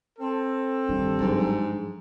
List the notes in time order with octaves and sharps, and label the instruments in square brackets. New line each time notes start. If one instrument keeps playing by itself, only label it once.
[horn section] C4 A4
[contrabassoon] G2 [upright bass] D#3
[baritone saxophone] G#2 [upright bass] F3 F#3